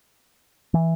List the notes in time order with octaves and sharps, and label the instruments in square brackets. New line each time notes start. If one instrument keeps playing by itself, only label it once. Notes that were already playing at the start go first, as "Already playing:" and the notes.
[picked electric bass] E3